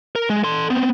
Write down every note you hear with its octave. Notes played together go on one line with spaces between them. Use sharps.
A#4
G#3
A4 C6
B3 C4